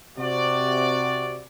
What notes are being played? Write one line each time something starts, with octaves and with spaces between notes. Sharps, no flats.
C3 F#4 D5